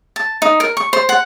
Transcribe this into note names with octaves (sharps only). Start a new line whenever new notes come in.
A5
D#4
A#4
C#6
C5
F#5